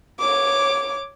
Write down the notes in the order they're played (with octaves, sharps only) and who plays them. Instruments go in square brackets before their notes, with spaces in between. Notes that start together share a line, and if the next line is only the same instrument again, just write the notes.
[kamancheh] C#5 D6